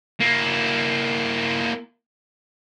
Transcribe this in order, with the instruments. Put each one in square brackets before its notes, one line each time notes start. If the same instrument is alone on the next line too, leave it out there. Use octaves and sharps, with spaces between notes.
[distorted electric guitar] A#3 E4